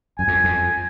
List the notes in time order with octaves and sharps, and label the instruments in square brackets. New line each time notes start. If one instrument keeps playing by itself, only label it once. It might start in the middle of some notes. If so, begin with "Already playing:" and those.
[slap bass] F#2 [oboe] G#5
[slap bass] F2
F2